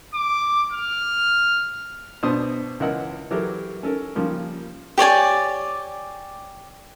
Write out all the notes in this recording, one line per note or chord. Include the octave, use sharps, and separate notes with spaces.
D6
F6
B2 D4 C5 A5 C6 D#6
C#2 E3 A#4 D#5 F#5 E6
E3 F#3 G4 A4 A#4
C#4 A4 A#4
C#3 F3 G3 A#3
G4 C#5 D5 G#5